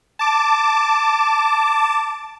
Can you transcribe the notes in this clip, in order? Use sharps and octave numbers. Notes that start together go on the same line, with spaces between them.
A5 D6